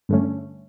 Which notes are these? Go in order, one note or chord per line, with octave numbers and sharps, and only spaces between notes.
G2 D3 A3 C#4